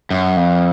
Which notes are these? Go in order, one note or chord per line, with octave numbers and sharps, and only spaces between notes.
F#2
F2